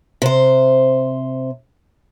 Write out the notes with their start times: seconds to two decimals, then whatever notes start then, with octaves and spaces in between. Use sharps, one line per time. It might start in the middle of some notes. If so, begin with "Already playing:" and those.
0.22 C3 C5